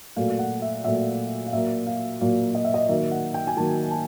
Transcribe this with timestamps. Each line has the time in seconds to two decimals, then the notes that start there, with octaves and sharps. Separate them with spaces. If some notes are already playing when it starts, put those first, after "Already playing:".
0.16 A#2 F#3 A3 F5
0.39 F#5
0.62 E5
0.84 A#2 F#3 A3 E5
1.47 F5
1.53 A#2 F#3 A#3 E5
1.87 F5
2.21 A#2 F#3 A#3 F5
2.55 D#5
2.65 E5
2.74 D#5
2.89 D#3 F#3 A#3 E5
3.11 F#5
3.34 G5
3.47 G#5
3.57 D#3 F#3 A#3 A5
3.91 A5